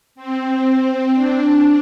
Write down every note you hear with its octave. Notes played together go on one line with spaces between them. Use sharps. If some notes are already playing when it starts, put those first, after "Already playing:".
C4
D4